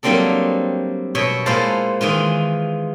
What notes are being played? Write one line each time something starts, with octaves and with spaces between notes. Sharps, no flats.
F#3 G3 A#3 C4 D4 A4
B2 C#5 E5
A#2 G#3 E4 C5 F5 A5
D#3 E3 G#3 F4